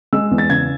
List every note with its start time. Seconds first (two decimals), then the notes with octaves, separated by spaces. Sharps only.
0.13 G#3 E6
0.31 E2
0.38 A6
0.49 C#3 G#6